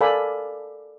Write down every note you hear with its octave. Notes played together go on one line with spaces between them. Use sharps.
A4 A#4 D5 F5 G#5 B5